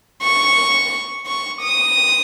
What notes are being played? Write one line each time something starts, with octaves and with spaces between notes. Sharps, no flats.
C#6
C#6
D#6